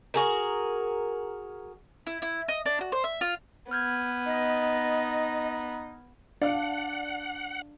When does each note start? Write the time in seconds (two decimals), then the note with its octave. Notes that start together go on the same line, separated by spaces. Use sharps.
0.14 F#4 G#4 A#4
2.07 E4
2.22 E4
2.48 D#5
2.66 D4
2.81 F#4
2.92 C5
3.04 E5
3.21 F4
3.71 B3 F6 G6 G#6
4.26 D#4 D#5
6.42 D4 D5 F5 F#5